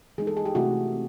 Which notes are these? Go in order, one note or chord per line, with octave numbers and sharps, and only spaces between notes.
E3 G#3 B3 D#4 G#4
A4
G#4
G4
C3 E3 A3 C#4 E4 F#4
C4